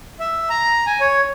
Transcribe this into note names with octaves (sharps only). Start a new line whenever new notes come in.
E5
A#5
G#5
C#5